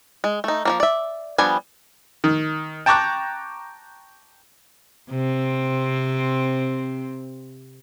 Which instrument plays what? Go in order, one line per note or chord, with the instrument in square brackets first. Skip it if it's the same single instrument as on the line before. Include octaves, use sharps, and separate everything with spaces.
[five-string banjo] G#3
A3 D#4
F3 F#3 A#3
D5 E5
F3 G3 B3 D4 G#5
[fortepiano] D#3
G5 A5 A#5 C#6 D6 F#6
[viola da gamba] C3 C4